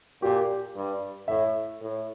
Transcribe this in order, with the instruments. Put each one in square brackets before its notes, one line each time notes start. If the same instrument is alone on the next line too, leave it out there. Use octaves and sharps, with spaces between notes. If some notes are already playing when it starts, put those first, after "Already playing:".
[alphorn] A#2 [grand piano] G4
[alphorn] G2
[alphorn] A2 [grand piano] E5
[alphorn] A2